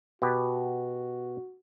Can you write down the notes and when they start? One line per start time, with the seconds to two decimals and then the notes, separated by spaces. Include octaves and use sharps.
0.22 B2 B3 F#4 G4